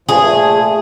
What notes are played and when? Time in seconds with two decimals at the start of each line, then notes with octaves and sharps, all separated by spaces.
0.09 G2 A#2 F3 G#4
0.22 A#2 A3